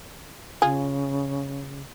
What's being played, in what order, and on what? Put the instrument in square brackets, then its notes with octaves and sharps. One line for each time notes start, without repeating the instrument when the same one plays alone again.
[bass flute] C#3 [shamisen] F4 G#4